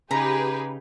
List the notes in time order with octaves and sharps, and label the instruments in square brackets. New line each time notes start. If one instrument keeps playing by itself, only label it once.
[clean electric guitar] C#3 D#4 [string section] G4 G#4 B4 [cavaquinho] A#5 B5